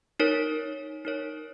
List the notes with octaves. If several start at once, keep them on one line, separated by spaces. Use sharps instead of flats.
D#4 A#4 C#5
D#4 A#4 C#5